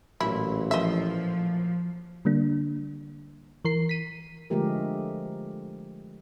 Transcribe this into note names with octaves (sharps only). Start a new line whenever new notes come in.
A1 A#2 E3 F#3 E4
F3 D#5 E5
D3 G3 A#3 D4
E3 A#4 C7
B6 D#7
D3 F3 G#3 A3 G4 A#4